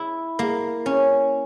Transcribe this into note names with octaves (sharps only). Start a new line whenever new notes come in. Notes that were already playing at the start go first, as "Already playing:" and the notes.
Already playing: E4
A#3
C#4